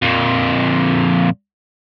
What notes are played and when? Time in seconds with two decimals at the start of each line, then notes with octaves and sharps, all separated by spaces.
0.02 F2 A#2